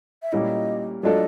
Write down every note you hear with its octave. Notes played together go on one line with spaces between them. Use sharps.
E5
A#2 G3 A#3 C#4 E4 D#5
F#3 A3 D4 F4 A4 D#5